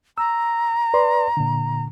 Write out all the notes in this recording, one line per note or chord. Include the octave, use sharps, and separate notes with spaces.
A#5 E6
B4 D5 C6
A#2 D3